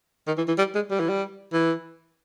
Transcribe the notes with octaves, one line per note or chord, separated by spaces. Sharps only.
D#3
E3
E3
G3
G#3
G3
E3
G3
E3